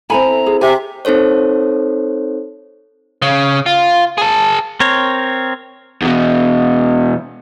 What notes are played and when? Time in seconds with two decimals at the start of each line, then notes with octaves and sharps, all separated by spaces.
0.10 C4 E4 A4 G#5 A#5 B5
0.46 G#4
0.61 C3 E5 G#5
1.05 C4 D#4 A4 C5 C#5
3.22 C#3
3.66 F4
4.18 G#4 A5
4.80 C4 A#4 C#5
6.02 E2 B2